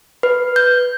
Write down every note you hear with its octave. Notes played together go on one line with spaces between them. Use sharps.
B4
G6